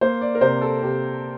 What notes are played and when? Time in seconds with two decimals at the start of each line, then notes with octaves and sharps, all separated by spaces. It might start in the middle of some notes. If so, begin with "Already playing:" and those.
0.01 A#3 C5
0.21 D5
0.35 A#4
0.41 C3 C5
0.61 A4
0.82 C3 G4